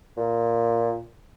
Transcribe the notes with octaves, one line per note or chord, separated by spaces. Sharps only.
A#2